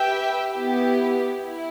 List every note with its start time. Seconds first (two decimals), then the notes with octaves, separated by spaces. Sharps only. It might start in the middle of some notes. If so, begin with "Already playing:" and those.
Already playing: G4 B4 E5 G5
0.54 B3 E4 G4
1.39 E4